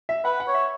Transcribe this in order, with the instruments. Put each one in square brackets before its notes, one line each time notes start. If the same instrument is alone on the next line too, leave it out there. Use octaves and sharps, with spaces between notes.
[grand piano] E5
[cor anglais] B4 [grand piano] F#5
[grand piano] F#5
[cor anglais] C#5
[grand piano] E5